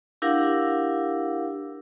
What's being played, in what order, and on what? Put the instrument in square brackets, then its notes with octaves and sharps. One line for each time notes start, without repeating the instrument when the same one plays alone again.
[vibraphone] D4 E4 G4 A#4 F5 F#5